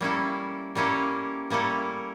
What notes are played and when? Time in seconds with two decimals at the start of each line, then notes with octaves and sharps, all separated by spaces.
0.01 G3 A#3 C#4 E4 A4
0.75 G3 A#3 C#4 E4 A4
1.50 G3 A#3 C#4 E4 A4